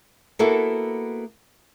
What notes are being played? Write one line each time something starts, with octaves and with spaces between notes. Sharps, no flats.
A#3 B3 E4 F#4 A4